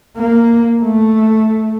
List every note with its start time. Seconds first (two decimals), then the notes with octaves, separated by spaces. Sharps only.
0.17 A#3
0.82 A3